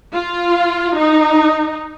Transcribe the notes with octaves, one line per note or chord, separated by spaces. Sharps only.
F4
D#4